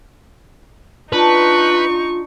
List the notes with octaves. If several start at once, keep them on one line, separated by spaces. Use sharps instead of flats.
D4 D#4 F4 B4 C#6